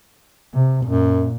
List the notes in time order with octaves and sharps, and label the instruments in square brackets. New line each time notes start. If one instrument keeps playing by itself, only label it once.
[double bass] C3
[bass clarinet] F#2 [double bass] A#2